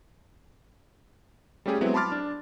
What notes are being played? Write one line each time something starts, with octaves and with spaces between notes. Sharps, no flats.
G3 A3 C#4 G4 G#4
F#3 G#3 B3 C4 E4
A5 B5 C6 D6 F6 A6
D4